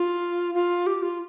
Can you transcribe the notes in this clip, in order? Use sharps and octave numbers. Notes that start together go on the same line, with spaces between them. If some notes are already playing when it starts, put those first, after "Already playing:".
Already playing: F4
F4
G4
F4